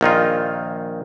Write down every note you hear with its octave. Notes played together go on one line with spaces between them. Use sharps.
A#1 D#3 D#4 F4